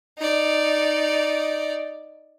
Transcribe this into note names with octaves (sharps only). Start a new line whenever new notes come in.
D#4 D5